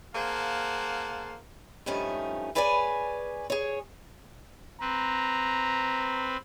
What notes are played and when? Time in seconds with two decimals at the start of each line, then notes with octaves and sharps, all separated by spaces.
0.15 A#3 G#4 C5 F5 F#5 A5
1.86 G2 F3 A3 C#4 D#4
2.55 G#4 B4 C#5 D5 E5 G#5
3.50 G#4 C#5
4.81 C4 B4 A#5